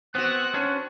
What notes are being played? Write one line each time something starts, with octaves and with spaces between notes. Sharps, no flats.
B3 C4 F#4 F#6
C#4 D4